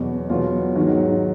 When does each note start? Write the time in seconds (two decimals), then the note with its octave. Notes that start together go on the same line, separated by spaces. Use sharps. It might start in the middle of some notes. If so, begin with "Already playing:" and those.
Already playing: E2 B2 F#3 F#4
0.29 E2 B2 F#3 F4
0.75 G#2 D#3 F#3